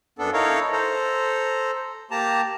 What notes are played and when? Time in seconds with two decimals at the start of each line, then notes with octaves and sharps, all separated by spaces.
0.19 F#2 B3 D4 A4
0.33 D#4 E4 A4 A#4 C#5 F5
0.73 A4 C5 A#5
2.11 A#3 G4 A5 A#5